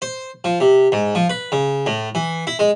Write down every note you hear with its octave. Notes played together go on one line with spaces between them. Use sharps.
C5
F3
C3
G#2
F3
B4
C#3
A2
E3
E4
G#3